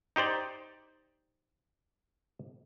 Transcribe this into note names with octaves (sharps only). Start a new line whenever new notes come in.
D#4 G4 C5 D5